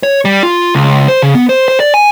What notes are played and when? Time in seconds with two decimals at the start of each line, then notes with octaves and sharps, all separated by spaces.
0.03 C#5
0.25 G3
0.43 F4
0.75 C#2
1.08 C5
1.22 C#3
1.35 B3
1.49 C5
1.68 C5
1.80 D5
1.94 G#5